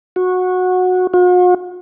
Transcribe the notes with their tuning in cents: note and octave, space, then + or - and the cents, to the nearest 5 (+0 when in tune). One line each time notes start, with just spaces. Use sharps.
F#4 -15
F#4 -45